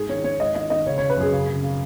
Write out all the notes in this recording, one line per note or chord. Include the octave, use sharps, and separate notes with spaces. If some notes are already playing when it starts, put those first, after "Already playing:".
Already playing: G#2 G#4
D#3 C#5
D#3 C#5
G#2 D#5
D#3 D#5
D#3 D#5
C#3 C#5
C#5
C#3
B4
F#2 G#4
C#3
C#3
C#3